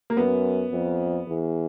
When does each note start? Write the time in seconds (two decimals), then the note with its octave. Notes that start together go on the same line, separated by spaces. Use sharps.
0.10 A#3
0.17 F#2 B3
0.72 F2
1.27 E2